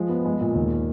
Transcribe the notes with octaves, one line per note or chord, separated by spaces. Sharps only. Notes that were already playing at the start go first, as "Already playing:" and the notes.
Already playing: F3 G#3
B3
G#3
A#2
D#2